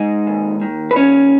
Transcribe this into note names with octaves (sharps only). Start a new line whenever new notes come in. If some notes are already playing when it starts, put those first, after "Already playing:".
Already playing: G#3 D#4 D#5
D#2
D#3
B4
D#2 C#4 C#5